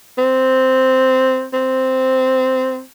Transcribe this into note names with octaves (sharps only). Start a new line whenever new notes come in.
C4
C4